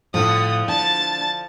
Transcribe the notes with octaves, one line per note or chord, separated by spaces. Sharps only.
A2 D3 F3 D#6
D4 A5 A6